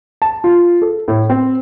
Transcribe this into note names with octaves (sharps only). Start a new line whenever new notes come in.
A5
F4
A4
A2
C4